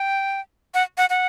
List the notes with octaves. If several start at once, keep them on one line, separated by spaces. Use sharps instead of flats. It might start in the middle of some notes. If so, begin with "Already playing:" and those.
Already playing: G5
F#5
F#5
F#5